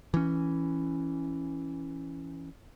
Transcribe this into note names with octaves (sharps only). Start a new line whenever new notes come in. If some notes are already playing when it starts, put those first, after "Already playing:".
E3 C#4